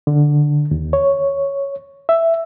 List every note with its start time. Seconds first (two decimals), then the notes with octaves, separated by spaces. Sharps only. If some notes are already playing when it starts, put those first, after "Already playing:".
0.07 D3
0.71 D#2
0.93 C#5
2.09 E5